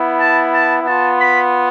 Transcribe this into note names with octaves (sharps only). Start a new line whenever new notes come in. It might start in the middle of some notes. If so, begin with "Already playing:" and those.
Already playing: B3 E4
A5
A5
B3 F4 A5
B5